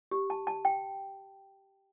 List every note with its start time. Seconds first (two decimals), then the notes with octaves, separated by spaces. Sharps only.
0.11 G4
0.30 A5
0.47 A5
0.65 G5